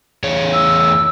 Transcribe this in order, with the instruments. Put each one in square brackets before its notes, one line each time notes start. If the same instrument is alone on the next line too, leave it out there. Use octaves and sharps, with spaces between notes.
[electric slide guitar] E2 G#4 C#5
[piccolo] E6